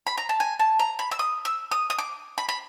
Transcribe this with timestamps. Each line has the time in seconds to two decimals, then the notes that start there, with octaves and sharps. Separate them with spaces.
0.07 B5
0.18 A#5
0.29 A5
0.40 G#5
0.60 A5
0.79 A#5
0.99 B5
1.11 E6
1.19 D#6
1.45 E6
1.71 D#6
1.90 D#6
1.98 D6
2.38 B5
2.49 B5